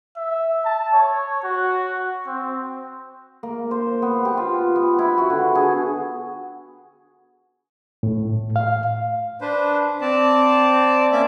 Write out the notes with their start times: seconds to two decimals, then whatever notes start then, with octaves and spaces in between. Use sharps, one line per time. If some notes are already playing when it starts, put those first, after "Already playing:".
0.17 E5
0.65 A5
0.94 C#5
1.43 F#4
2.27 C4
3.43 A#3
3.71 C5
4.02 B3
4.25 G4
4.37 F4
4.76 B3
4.99 E4
5.18 F#4
5.30 D3
5.55 G#4
8.03 A2
8.56 F5
9.41 D4 B4 C5
10.01 C4 D5 A5
11.12 A#3 C#4 D5 E5 D6